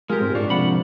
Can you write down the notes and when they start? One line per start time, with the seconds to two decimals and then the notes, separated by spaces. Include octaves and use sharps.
0.10 G#3 F4 G4 G#4 A#4
0.21 G#2 C4
0.35 G#2 D4 F4 C#6
0.50 C3 F3 F#5 B5